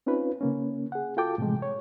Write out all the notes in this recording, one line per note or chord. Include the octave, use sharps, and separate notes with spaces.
C4 C#4 D#4 F4 B4
C#3 A#3 C#4
G#4 F#5
F4 F#4 A4 G5 A5 D6
A2 C3 E3 F3 G#3
C#5